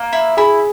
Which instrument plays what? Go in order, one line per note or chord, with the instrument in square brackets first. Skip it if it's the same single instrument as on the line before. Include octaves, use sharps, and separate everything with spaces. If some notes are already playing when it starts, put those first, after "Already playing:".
Already playing: [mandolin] A#3
E4
[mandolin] E4 [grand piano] G#4